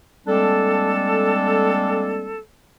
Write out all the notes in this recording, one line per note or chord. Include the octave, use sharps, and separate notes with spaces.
G3 G#3 A#3 C4 D4 A4